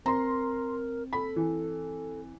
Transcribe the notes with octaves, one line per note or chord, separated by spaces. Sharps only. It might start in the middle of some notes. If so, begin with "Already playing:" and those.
C4 A#4 A#5 C6
A4 B5
E3